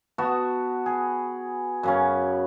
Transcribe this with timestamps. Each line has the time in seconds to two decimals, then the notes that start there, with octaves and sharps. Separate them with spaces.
0.18 B3 F#4 A5
0.86 G#4
1.83 F#2 C#3 C#4